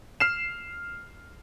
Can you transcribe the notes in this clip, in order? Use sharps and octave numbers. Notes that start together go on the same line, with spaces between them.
F6 C7 E7